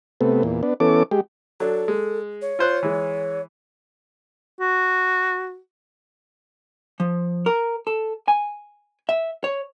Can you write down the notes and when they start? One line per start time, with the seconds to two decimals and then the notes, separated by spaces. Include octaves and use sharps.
0.21 C3 A3 B3
0.43 E2 A#2
0.63 B3 D4
0.80 E3 B3 C#4 A4 D6
1.11 G#3 G4
1.60 F#3 D4 A4
1.88 G#3
2.42 C#5
2.59 F4 C5 F#6
2.83 E3 G#3
4.60 F#4
7.00 F3
7.46 A#4
7.87 A4
8.28 G#5
9.09 E5
9.44 C#5